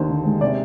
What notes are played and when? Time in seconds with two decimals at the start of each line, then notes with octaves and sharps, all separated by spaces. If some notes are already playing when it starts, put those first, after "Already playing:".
Already playing: D#2 D4 C5
0.09 D3
0.25 G#3
0.41 C3 D5